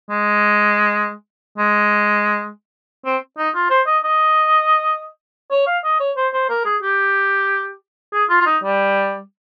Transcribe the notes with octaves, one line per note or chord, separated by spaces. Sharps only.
G#3
G#3
C4
D#4
F4
C5
D#5
D#5
C#5
F5
D#5
C#5
C5
C5
A#4
G#4
G4
G#4
F4
F4
D#4
G3